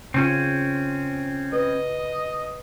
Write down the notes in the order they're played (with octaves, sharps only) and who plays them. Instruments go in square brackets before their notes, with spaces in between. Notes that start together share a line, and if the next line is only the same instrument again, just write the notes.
[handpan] C#3 F4 [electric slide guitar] C4 C#4
[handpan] B4 [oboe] D#5